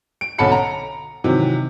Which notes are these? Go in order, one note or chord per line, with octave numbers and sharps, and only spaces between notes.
D7
B1 D3 C#4 A5 B5 C#7
A#5
C3 D#3 E3 F#3